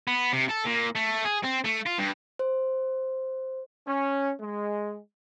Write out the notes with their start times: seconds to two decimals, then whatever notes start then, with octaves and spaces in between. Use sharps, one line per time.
0.08 B3
0.32 C3
0.49 A4
0.65 A#2
0.95 A3
1.24 G#4
1.43 C4
1.64 A3
1.86 F4
1.98 G2
2.39 C5
3.86 C#4
4.38 G#3